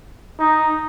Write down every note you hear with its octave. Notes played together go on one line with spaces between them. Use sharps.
D#4